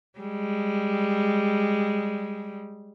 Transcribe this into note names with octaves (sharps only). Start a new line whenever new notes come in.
G3 G#3